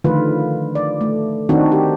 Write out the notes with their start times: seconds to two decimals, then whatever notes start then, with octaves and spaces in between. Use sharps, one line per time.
0.04 D3 D#3 F3 A3 F4 B4
0.75 D5
1.01 A3
1.49 D#3 C4 D4 D#4 F#4
1.72 G4